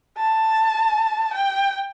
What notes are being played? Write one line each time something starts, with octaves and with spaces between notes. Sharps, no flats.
A5
G5